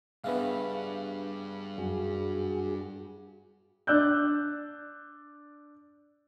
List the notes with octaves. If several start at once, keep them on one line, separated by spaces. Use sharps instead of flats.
G2 C#3 B3 B4 E5 F5
F#2 F#4 G#4
D4 D5 E6 F#6 G6